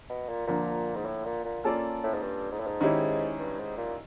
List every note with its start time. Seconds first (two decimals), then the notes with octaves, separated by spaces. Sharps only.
0.10 B2
0.29 A#2
0.47 A#2 D3 F3 A#3
0.96 G#2
1.05 A2
1.26 A#2
1.45 A#2
1.64 A#3 C#4 F4 A4 D5
2.04 A2
2.14 G#2
2.22 G2
2.52 G#2
2.60 A2
2.67 G#2
2.81 D#3 G#3 C#4 E4 G4
3.39 G2
3.59 G#2
3.77 A#2